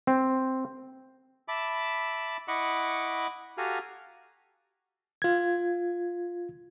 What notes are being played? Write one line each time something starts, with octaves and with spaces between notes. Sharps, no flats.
C4
E5 A5 B5 D6
E4 D#5 F#5 B5 C#6 D6
F#4 G4 A4 F5 G#5 A#5
F4 G#6